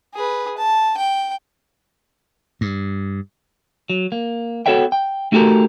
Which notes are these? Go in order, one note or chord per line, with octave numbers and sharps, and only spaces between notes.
G#4 B4
A5
G5
G2
F#3
A#3
B3 F#4 A4 C#5 E5 G5
G5
A3 D#4 F#4 G4 A4 A#4